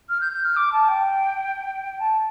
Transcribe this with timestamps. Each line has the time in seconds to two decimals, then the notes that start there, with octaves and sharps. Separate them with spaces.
0.09 F6
0.20 G6
0.32 G6
0.44 F6
0.56 D6
0.72 A5
0.88 G5
1.99 A5